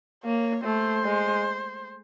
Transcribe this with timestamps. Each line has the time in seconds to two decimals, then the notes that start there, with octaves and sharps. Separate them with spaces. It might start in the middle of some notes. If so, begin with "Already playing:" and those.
0.25 A#3 C#5
0.64 A3 C5
1.04 G#3